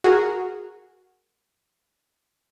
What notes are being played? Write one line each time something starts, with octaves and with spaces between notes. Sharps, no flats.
F#4 G#4 A#4